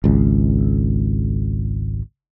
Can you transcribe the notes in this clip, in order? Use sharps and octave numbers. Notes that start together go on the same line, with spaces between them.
G#1 C#2